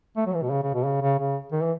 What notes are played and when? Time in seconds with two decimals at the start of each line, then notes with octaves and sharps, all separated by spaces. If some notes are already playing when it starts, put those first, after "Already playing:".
0.17 A3
0.26 F#3
0.34 E3
0.42 B2
0.50 C#3
0.63 C#3
0.74 B2
0.85 C#3
1.02 C#3
1.19 C#3
1.52 D#3
1.62 E3